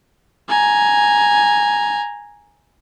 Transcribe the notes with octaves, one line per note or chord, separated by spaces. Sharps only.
G#5 A#5